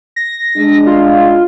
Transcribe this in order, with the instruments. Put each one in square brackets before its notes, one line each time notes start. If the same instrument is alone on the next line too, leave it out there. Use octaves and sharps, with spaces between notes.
[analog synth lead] A#6
[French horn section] G#3 D4
[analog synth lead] F4